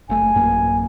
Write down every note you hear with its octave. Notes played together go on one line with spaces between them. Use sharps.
F#1 A3 G#5
A1 F#2 A#3